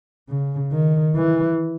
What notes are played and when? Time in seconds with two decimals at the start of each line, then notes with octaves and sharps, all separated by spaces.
0.29 C#3
0.72 D#3
1.16 E3